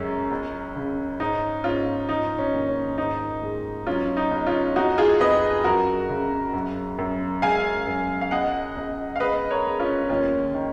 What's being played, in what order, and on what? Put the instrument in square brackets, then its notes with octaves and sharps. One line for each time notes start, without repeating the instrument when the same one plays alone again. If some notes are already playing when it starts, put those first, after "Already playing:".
Already playing: [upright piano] F#2 G#3 C#4
C#2
C#3
G#2 D#4
G#2 C#4 F4
F3 D#4
C#4
D#2
C#4
G#2 D#4
G#3
F#3 C#4 F4
D#4
C#2
C#4 F4
F2 D#4 F#4
F4 G#4
F2 B4 D#5
F#2 F#4 A#4
C#3
F#2
F#2
G#3 F5 G#5
F#2
F5
C#2 D#5 F#5
C#2
F5
G#3 B4 D#5
A#4 C#5
G#3
C#4 F4
D#2 C#4 F4
D#3